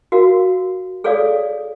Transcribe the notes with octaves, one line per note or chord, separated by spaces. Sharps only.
F#4 A#4 F5
G#4 A4 C#5 D5 F5 D#6